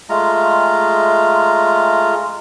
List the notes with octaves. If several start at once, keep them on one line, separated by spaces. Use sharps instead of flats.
G#3 A3 F4 A#5